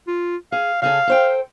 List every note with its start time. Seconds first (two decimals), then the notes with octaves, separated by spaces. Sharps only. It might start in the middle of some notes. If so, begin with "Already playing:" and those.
0.08 F4
0.52 G#4 F5
0.82 C#3 G#4 A4 F5
1.07 A4 C5 G5